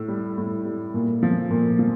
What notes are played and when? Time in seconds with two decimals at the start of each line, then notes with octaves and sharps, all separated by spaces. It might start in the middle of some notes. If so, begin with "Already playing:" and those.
Already playing: A2 E6
0.08 G3
0.38 A2
0.65 G3
0.94 A#2
1.23 F3
1.51 A#2
1.79 F3